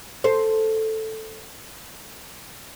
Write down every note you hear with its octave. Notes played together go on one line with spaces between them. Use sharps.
A4 C5